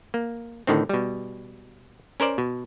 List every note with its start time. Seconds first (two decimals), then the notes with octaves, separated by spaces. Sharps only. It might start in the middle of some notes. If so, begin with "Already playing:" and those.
0.14 A#3
0.67 A2 D3 D#3 C4
0.89 B2 G3
2.20 C#4 A#4 C5 D5
2.38 B2